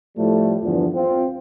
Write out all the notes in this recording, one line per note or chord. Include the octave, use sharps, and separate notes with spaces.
A2 F3 G3 A3
E2 G2 D3 F3
C4 F4